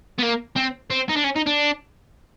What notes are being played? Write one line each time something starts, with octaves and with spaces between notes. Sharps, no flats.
B3
A#3
C4
C4
D#4
D4
C#4
D#4
D4